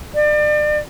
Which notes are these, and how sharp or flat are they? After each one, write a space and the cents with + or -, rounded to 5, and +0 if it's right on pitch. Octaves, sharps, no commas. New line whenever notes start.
D5 +35